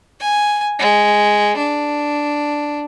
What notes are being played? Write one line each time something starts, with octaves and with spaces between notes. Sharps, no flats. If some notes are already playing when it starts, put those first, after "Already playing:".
G#5
G#3
D4